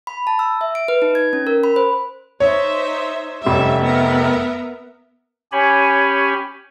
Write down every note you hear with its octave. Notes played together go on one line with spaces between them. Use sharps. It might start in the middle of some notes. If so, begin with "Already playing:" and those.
B5
A5
E6
E5
D7
B4
D#4
G#6
C#4
A#4
B5
C5
D#4 C5 C#5 E5
F1 G3 C#4 E5
B3 A#4 E5
C#4 G4 C#5 G#5 B5